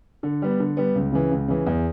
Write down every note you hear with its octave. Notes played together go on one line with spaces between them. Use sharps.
D3
G3 B3
D3
G3 B3
C#2
C#3 E3
C#2
C#3 E3
E2